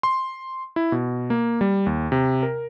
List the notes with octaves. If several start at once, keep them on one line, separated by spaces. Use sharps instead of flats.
C6
E4
B2
A#3
G3
D#2
C3
A#4